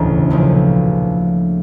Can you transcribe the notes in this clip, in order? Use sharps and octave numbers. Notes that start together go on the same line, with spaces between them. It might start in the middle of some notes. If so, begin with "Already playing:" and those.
Already playing: E1 A1 D2 A2 C#3 A4
B1 A#2 F3